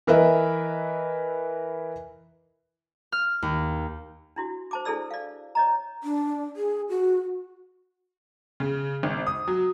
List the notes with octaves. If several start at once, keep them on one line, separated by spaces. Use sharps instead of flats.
E3 A#4 B4 D#5 E5
F6
D#2
D4 E4 F#4
C5 A5 D6
D4 E4 G#4 A4 D5 E6
D5 F5
C#5 D#5 A#5
D4
G#4
F#4
C#3
G#1
D#6
F#3